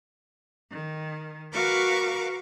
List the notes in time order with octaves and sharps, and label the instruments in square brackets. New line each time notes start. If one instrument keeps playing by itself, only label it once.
[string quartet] D#3
F#4 A#4 B4 F5 C#6 D6